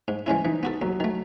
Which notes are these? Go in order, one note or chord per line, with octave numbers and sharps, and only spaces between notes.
G#2
E3 G#3 C#4 E4
E3 D#4
B3 F#4 A4
D#2 F#3
D#3 A3